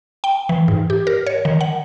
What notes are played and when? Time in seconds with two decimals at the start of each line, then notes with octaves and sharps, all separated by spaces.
0.24 G5
0.49 E3
0.68 G#2
0.90 G4
1.07 A#4
1.27 C#5
1.45 D#3
1.61 F#5